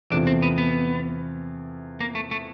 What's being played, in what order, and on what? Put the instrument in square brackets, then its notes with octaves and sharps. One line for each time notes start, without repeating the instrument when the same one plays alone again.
[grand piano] E2 C3 F3 A3 [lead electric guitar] D4
[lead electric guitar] C4
B3
B3
A#3
A3
A3